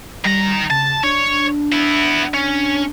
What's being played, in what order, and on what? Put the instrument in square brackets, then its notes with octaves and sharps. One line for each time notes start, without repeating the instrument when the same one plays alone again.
[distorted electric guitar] D#3 A#5 [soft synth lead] G3
[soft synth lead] C#3 [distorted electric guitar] A5
[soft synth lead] D4 [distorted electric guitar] C#5
[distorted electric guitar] B3 E4
C#4